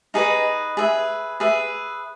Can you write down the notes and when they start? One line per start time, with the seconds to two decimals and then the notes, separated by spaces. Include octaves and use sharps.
0.14 D#4 G#4 B4 D#5
0.77 G#4 B4 E5
1.40 G#4 B4 E5